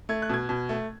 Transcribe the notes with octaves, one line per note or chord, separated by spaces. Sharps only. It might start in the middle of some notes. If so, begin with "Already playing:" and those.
A3 G#6
F#6
B2 G#6
B2
A3